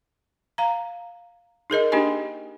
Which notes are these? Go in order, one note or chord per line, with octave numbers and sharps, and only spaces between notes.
F5 A#5
D#4 G#4 A#4 D#5
A#3 D4 D#4 G4 D#5 G#5